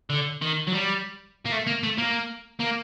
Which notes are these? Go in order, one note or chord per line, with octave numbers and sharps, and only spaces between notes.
D3
D#3
F#3
G3
A#3
A3
A#3
A3
A#3
A#3